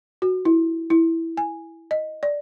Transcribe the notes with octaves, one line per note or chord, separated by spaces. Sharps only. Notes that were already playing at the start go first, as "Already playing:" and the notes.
F#4
E4
E4
G#5
D#5
D5